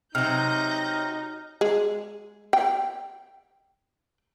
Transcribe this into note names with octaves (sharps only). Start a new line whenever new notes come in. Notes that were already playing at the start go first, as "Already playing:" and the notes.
C3 F#3 D#4 F6 G6 A#6
G#3
G5